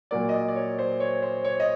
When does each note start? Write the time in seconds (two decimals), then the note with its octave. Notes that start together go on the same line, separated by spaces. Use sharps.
0.11 A#2 F#3 A#3 D5
0.29 D#5
0.34 D5
0.48 D5
0.56 C#5
0.79 C5
1.00 C#5
1.22 C5
1.45 C#5
1.60 D#5